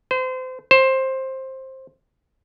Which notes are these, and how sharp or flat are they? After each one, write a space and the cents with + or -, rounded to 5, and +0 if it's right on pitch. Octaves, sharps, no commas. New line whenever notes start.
C5 -30
C5 +15